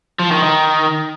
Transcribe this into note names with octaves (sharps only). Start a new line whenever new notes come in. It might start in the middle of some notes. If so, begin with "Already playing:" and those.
F3
D#3
D#3